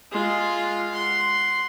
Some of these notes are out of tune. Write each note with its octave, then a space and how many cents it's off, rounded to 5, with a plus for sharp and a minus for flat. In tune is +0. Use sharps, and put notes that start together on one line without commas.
G#3 +0 F4 +0
F#5 +0 C6 +0